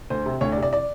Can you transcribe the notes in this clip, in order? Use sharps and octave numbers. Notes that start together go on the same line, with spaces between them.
D2 C5
C3
D2 C#5
D5
C3
D5
D5